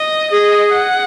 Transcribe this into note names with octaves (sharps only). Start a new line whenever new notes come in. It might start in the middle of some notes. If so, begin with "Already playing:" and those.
Already playing: D#5
G#4 D#5
F#5